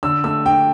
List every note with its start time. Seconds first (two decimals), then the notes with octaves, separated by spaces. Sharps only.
0.03 D3 E6
0.24 A3 E6
0.46 D4 G5